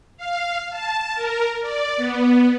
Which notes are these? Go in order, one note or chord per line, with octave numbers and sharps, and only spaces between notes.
F5
A5
A#4
D5
B3